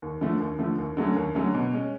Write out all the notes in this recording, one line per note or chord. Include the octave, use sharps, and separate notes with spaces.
D#2
D3 F3 A3
D#2
D3 F3 A3
D#2
D3 F#3 A3 C#4
D#2
D3 F#3 A3 C#4
B2
G#3 C#4